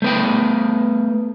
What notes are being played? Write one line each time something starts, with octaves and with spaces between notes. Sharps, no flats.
A3 B3 G5